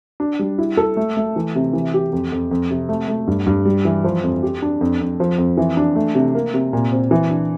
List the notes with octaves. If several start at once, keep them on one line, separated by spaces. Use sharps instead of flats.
D4
G3
E4
A4
A3
A3
E3
C3
E3
G4
F2
F2
F2
C3
A3
A3
G2
G2
G3
E3
F3
F2
G4
D4
F2
F2
F3
F2
E3
D4
A3
C3
A#3
C3
A#2
C4
E3
D4